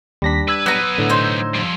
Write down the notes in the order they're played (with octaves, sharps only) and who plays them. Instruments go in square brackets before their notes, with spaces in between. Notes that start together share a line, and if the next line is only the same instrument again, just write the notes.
[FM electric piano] D#2 A#6 B6 [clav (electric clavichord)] G3 D4
[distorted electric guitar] B4 B5 [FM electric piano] E6 G#6
[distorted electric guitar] F#3 B4 [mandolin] B3 A#5
[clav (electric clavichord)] A2 D3
[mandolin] D#4 C5
[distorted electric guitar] F3 G3